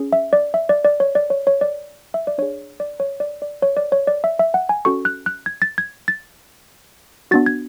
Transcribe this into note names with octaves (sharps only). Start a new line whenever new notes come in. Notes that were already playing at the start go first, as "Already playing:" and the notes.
Already playing: C#4 G#4
E5
D5
E5
D5
D5
C#5
D5
C#5
C#5
D5
E5
D5
D4 G#4 C#5
D5
C#5
D5
D5
C#5
D5
C#5
D5
E5
E5
F#5
G#5
C#4 F#4 A4 C#6
F#6
F#6
G#6
A6
G#6
A6
B3 D4 F#4 A6
G#6